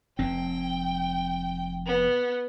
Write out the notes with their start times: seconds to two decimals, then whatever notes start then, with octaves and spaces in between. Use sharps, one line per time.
0.19 F1 C4 G5
1.86 B3